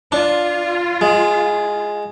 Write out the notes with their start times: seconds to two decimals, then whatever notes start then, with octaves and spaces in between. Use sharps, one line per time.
0.12 D4 F4
1.01 G#3